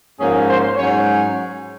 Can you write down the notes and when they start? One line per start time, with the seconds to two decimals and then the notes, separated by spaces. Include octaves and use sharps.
0.20 G#2 F3 A#3 C#4 G#4
0.49 C5
0.76 G#2 F#3 C#4 C#5